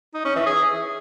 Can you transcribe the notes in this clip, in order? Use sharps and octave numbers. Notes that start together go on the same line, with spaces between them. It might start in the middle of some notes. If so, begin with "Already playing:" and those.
D#4
C#4
E3
G#4